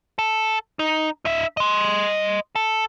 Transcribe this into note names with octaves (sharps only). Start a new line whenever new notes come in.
A4
D#4
D#4 E5
D#5 C6
A4